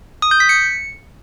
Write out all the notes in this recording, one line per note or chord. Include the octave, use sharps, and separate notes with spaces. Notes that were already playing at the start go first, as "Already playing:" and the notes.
D#6
G6
B6
C#7